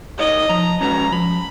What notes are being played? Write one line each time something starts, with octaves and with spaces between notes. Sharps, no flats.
D#4 A#4 C#5 D#5
F3 A#5
G#3 C#4 F#4 B4 A#5
F3 B5